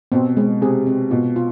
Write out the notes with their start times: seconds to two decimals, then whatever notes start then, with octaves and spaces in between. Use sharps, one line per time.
0.12 B2 C4
0.37 G#3
0.62 C3 G#4
0.86 C4
1.11 B2 F4
1.36 F4